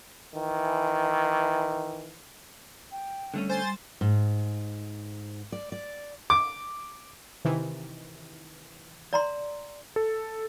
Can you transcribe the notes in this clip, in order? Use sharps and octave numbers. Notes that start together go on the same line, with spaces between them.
D#3 E3
G5
D3 G3 A3 C#4
C5 G#5 A6
G#2
D5
D5
D6
C3 D#3 E3
D5 A#5 C6
A4